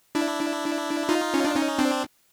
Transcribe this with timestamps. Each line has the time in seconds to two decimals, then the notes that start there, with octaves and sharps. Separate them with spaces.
0.15 D4 E4
1.09 D#4 F4
1.34 C#4
1.45 D4
1.56 C#4 D#4
1.79 C4 D4